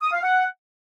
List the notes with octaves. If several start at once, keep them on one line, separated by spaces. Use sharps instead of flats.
D#6
F5
F#5